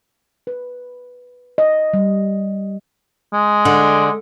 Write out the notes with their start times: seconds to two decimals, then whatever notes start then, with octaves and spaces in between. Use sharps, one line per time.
0.47 B4
1.58 D#5
1.94 G3
3.33 G#3
3.65 D3